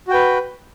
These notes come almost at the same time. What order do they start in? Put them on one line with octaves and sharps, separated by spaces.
F#4 G5 B4